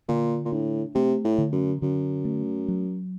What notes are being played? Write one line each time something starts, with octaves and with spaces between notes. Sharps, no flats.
A#2 D3
A#2
A2 D4
C3 A3
A2
D3
F#2
F#2 D3
A3
F#3